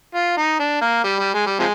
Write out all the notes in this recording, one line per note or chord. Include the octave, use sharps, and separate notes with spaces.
F4
D#4
D4
A#3
G3
G3
G#3
G3
C3 F3 G#3